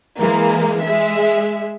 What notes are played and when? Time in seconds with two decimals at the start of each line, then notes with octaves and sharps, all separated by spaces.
0.19 E3 G#3 A#3
0.83 G#3 E5